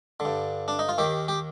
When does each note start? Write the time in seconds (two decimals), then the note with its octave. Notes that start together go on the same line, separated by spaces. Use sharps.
0.20 D3
0.25 G2
0.68 D4
0.79 D#4
0.89 F4
0.98 D#2 D#3 G4
1.28 G4